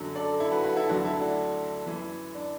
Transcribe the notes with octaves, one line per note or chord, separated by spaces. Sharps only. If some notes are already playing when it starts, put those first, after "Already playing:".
Already playing: F#2 D3 F#3
A4 D5
E4 A4
F#4 B4
F#4 B4
E4 A4
D2 D3 F#3 D4 F#4
E4 A4
D4 F#4
F#2 E3
D4